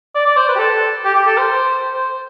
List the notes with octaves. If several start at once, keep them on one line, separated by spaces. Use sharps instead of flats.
D5
D5
C5
B4
G4
A4
G4
G4
A4
C5
C5